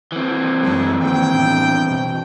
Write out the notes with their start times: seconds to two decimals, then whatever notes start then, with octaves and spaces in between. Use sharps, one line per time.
0.12 E3 C4
0.63 F#2 F#3 G#3 F#4 G#4 A4
1.01 D#3 F3 A#3 G5
1.34 A2 B3 D4
1.91 B2